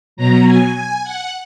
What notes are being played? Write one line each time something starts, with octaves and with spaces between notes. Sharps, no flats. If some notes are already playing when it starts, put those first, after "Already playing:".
B2 F#3 A#5
G#5
G#5
F#5